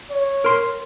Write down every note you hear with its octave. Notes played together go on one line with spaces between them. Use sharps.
C#5
A#4 C6